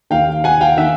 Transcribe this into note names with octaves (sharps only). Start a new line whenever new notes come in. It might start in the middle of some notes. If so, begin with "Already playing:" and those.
D#2 D#3 F5 G5
F#5 G#5
F5 G5
D#3 E5 F#5